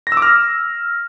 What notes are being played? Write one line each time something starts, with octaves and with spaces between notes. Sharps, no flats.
A#6
E6
D6
F6